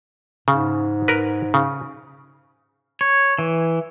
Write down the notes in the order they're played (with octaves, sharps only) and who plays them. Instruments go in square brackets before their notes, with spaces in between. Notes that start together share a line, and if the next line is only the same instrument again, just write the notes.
[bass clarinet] G#2 [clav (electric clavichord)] C#3
[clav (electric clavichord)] A#4 B4
C#3
[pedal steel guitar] C#5
E3